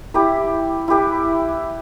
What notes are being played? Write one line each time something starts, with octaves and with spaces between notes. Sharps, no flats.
E4 G4 B4
E4 G4 B4